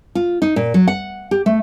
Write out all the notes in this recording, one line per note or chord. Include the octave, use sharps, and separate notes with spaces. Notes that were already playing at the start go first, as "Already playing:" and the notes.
F4
D#4
A#2
F#3
F#5
G4
A3